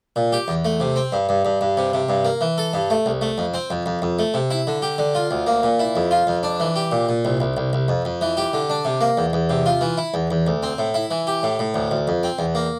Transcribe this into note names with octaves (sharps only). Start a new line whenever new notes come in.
A#2
G4
E2
A3
C3
C4
G2
G2
G2
G2
C3
C3
G2
A#3
E3
A4
G2
A3
C2
A3
F2
C4
F2
F2
F2
A3
C3
E4
D3
G4
D3
F4
D2
A#3
A#2
E4
F2
F4
F2
D4
E3
G4
A#2
A#2
C2
C2
C2
C2
F2
F2
E3
G4
D3
D4
C3
A#3
E2
E2
C3
F4
E3
E4
E2
E2
D2
C4
A2
E4
E3
G4
A2
A2
D2
D2
F2
C4
E2
A#3